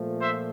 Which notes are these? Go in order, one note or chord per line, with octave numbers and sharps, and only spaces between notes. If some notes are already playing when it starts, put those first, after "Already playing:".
Already playing: A#2 F3 A3
C5 E5